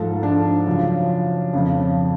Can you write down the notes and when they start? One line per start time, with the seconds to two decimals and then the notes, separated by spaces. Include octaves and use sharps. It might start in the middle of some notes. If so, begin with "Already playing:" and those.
Already playing: G#2 F3 A4
0.23 D4
0.67 F#2 C#3 F3
1.53 F2 C#3 F3